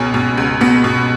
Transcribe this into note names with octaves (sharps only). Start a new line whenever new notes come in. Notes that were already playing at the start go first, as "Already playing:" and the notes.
Already playing: C#2 B2 C#4
B2
C#2
B2 B3
B2